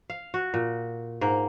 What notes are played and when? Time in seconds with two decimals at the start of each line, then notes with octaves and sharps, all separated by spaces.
0.10 F5
0.34 F#4
0.54 A#2
1.21 G#2 A#3